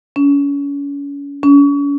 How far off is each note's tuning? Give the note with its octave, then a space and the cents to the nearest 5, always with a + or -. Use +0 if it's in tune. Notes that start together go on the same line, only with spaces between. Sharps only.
C#4 +35
C#4 +40